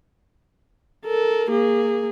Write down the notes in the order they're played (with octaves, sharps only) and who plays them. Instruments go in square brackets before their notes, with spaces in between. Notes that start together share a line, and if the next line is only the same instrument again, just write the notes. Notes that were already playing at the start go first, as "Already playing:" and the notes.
[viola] A4 A#4
A#3 G#4